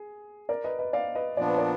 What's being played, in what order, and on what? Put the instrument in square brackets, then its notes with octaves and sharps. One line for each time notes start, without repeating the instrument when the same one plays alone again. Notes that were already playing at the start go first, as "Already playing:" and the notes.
Already playing: [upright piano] G#4
A#4 D5
B4 D#5
B4 D#5
D5 F5
B4 D#5
[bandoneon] A#2 F3 B3 D4 [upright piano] D5
[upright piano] B4
A#4 D5